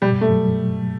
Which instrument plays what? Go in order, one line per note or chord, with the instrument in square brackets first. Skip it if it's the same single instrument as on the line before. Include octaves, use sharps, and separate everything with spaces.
[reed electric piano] B2 [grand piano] G3
[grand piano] A3
[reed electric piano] F#3